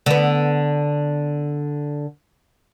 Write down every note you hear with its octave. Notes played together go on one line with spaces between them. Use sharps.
D3 B3